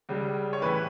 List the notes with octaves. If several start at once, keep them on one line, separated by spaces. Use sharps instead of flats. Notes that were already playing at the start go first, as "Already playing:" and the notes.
C#2 C#3 G3
C#5
A2 E3 B4